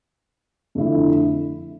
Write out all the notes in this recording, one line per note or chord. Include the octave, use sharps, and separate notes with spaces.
F2 D3 A3 E4